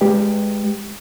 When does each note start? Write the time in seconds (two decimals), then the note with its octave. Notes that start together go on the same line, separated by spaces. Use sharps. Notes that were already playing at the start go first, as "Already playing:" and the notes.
0.01 G#3 G4 B4 D#5 G5